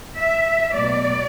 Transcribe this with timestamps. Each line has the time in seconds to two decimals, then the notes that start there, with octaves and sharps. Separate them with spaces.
0.18 E5
0.73 B2 F#3 A3 D5